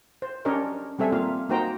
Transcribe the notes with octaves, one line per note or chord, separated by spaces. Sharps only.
C5
C#4 D4 G4 A#4 C#5 D#5
G3 C4 A4 E5 G#5
A#3 F4 F5
A#3 D#4 F#4 C5 G5 A#5